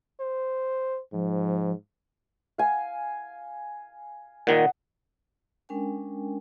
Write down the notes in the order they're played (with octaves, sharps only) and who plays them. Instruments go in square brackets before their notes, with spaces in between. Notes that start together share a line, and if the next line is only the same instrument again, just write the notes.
[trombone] C5
[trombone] G#2 [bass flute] F3
[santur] F5 G#5
[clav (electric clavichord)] A#2 D#3 [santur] F#5 D#6
[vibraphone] G#3 C#4 D4 A#4 G5 G#5